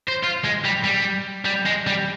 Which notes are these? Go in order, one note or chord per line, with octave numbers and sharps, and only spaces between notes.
C5
F4
G#3
G3
G3
G3
G#3
G3